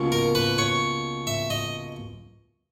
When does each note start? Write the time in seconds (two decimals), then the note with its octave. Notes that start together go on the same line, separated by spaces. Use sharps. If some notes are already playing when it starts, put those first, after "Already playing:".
Already playing: C#2 B2 A#3 C#4
0.12 A#4
0.35 B4
0.58 C#5
1.27 E5
1.50 D#5